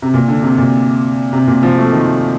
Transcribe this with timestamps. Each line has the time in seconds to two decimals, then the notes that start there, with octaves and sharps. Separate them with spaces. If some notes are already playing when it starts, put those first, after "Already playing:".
0.02 C3
0.14 A#2
0.28 D3
0.43 C3
0.58 A#2
1.33 C3
1.47 A#2
1.63 F3
1.78 A3
1.92 D#3